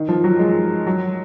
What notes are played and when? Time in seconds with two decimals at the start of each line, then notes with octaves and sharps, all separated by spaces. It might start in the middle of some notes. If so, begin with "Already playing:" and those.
Already playing: D#3
0.09 F3
0.24 F#3
0.39 G#3
0.87 F#3